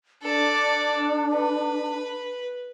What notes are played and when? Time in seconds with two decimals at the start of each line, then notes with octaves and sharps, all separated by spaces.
0.22 D4 A4 D5
1.35 B4